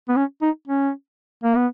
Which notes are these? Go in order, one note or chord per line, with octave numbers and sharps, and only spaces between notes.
B3
C#4
D#4
C#4
A#3
B3